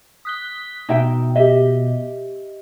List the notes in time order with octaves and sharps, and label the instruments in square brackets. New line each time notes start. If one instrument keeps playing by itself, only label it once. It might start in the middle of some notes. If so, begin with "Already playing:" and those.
[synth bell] D#6 F#6 G7 [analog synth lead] B6
[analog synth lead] B2 [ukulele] D#4 E5 G5
[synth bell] G4 D#5 [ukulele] E5